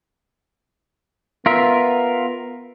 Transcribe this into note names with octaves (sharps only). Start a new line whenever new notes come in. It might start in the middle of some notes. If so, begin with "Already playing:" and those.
B3 F4 A#4 E5